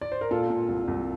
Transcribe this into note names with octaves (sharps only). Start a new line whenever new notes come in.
D5
C5
A#4
A#2 F4 A4
A#2
C2
C2